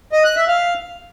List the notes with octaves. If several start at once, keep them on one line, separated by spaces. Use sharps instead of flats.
D#5
F#6
E5
F5